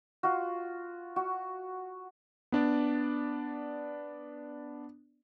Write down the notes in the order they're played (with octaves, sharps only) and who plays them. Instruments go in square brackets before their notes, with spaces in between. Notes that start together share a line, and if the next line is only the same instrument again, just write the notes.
[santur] F4 F#4
F#4
[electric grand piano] B3 D4 D5